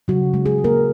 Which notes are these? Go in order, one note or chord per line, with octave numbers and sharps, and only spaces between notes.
C#3 F#3 F#4
G#3
G#3 G#4
G#3
A#3 A#4